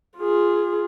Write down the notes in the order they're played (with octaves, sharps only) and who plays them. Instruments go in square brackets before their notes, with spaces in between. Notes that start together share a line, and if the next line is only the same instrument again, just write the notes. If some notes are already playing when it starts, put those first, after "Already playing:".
[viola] F4 G#4